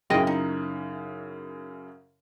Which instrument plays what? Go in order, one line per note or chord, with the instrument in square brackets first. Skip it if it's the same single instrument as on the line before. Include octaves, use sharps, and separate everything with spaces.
[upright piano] F#2 C#3 E4 [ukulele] G#4 D#5 G5
[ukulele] D#4